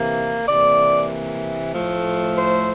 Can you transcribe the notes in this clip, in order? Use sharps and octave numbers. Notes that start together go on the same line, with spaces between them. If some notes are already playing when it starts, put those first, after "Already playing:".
Already playing: C3 E3 A#3
C3 E3 A#3 D5
A2 F3 A3
C5